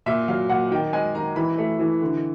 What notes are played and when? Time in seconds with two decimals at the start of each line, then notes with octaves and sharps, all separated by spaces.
0.06 A#2 E5
0.28 F#3 F5
0.49 A#2 F#5
0.71 D#3 G5
0.93 G#3 G#5
1.15 D#3 A#5
1.36 E3 B5
1.58 A3
1.79 E3
2.02 D3